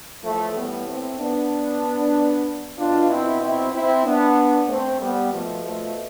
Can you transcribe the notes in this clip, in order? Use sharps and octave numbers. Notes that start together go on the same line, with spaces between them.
A2 E3 F3 A3
G3 B3
A3 C4
B3 D4
B2 D4 F4
C4 E4
C4 E4
C4 E4
B3 D4
A3 C4
G3 B3
B2 F3 A3
F3 A3